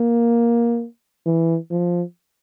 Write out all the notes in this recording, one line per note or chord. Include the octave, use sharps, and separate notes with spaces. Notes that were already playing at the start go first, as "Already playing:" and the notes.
Already playing: A#3
E3
F3